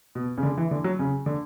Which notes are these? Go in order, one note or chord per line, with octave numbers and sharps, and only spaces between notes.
B2
C#3
D3
E3
D3
F#3
C#3
D3